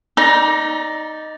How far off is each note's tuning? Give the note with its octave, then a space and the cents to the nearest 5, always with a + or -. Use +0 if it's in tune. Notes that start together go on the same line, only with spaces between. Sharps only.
D#4 +0 D5 +0 A#5 +40